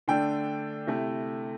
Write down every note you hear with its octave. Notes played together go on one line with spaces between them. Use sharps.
D3 A3 D4 G5
C3 A3 E4